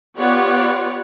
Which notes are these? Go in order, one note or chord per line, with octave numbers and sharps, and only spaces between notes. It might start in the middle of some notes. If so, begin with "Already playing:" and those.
B3 F4 G4 C#5 D5 F#5